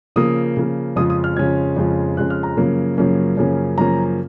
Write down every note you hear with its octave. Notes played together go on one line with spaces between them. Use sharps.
C#3 F3 A#3 D#6
C#3 F3 A#3
F2 C#3 G#3 C#4 F4 D#6
D#6
F6
F2 C#3 G#3 C#4 F4 G#6
F2 C#3 G#3 C#4 F4
F2 C#3 G#3 C#4 F4 F#6
F6
A#5
F#2 C#3 F3 A#3 C#4
F#2 C#3 F3 A#3 C#4
F#2 C#3 F3 A#3 C#4
F#2 C#3 F3 A#3 C#4 A#5